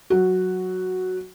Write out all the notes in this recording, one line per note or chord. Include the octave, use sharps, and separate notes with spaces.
F#3 F#4